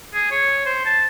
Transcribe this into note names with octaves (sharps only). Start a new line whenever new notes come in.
G#4
C#5
C5
A5